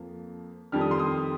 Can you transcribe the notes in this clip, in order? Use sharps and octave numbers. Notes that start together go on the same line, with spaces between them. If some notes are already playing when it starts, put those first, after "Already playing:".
Already playing: F2 F3 A#3
F2 D#3 G3 F6
D#6
C6
D#6